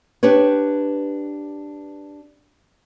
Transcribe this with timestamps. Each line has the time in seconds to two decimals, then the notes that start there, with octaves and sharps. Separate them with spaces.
0.23 D4 G4 B4 C#5